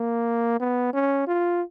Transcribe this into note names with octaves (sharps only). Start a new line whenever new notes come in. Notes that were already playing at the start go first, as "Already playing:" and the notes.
Already playing: A#3
B3
C#4
F4